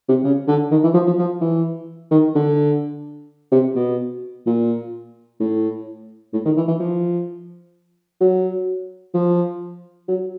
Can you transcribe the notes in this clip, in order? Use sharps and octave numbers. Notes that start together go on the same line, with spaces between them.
C3
C#3
D3
D#3
E3
F3
F3
F3
E3
D#3
D3
C3
B2
A#2
A2
A2
D#3
E3
E3
F3
F#3
F3
F#3